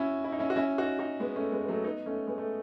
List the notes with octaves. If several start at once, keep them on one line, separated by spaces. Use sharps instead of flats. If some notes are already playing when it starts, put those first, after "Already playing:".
Already playing: C#4 E4 F#4
E4
D#4
C#4 E4
F#4
C#4 E4
D#4 F#4
D#4 F#4
G#3 B3
A3 C#4
G#3 B3
B3
F#3 A3
B3 D#4
A3 C#4
G#3 B3
A3